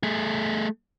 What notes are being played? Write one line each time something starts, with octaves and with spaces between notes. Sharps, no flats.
A3 G#4